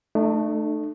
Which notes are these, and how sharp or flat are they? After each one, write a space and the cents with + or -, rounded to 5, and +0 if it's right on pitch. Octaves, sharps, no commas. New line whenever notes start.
A3 +0 D#4 -45